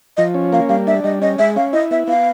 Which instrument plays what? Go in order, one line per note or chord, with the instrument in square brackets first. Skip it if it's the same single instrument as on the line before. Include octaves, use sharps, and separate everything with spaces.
[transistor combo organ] F3 [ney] D#5
[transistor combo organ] C#4
[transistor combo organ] A#3 [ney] F5
[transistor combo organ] G3 [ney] F5
[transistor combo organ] D4 [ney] E5
[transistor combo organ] G3 [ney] D#5
[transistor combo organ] C#4 [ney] D#5
[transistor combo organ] G#3 [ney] E5
[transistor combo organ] C#4 [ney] F5
[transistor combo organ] E4 [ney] D#5
[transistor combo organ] B3 [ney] E5
[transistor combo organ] B3 [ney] F5